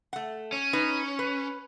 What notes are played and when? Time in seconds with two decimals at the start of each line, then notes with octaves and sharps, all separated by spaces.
0.13 A3 F#5
0.52 C#4
0.73 D#4 B4
1.19 B4